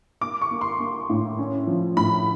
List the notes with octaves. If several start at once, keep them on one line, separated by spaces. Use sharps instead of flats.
A#3 D6
C#6
A#3
C6
A#3
A2
C#4
F3
A2 B5